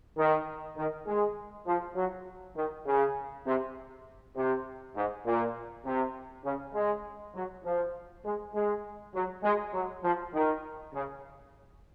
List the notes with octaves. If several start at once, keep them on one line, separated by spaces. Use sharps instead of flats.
D#3
D#3
G#3
F3
F#3
D#3
C#3
C3
C3
G#2
A#2
C3
C#3
G#3
F#3
F3
G#3
G#3
F#3
G#3
F#3
F3
D#3
C#3